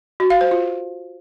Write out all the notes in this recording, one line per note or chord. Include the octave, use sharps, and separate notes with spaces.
F#4
F5
C5
F4